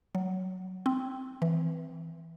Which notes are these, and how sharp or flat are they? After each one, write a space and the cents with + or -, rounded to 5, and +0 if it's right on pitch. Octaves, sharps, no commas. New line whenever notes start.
F#3 +5
C4 -5
E3 -5